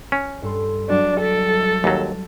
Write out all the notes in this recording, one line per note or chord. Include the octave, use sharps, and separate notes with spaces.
C#4
G2 A4 C6
F#3 G3 D4 F#4
A4 A6 B6 D7
D#2 F#3